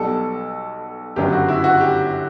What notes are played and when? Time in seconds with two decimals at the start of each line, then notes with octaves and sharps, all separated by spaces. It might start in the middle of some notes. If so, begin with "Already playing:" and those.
Already playing: B1 B2 G3 A4
1.16 G1 F#2 C#3 F#3 G4
1.32 F#4
1.48 E4
1.64 F#4
1.81 G4